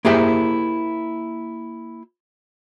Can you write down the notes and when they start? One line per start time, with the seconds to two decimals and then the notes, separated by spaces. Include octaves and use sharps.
0.05 A#3 E4 G4 G#4 C5 E5